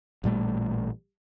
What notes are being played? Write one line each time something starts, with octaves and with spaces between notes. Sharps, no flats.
A1 A#2 G3 A3